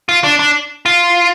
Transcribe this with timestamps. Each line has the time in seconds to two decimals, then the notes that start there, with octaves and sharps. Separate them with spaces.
0.09 F4
0.24 D4
0.39 D4
0.86 F4